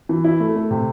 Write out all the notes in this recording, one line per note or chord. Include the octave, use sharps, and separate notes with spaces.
E3
E4
A3
A3
C3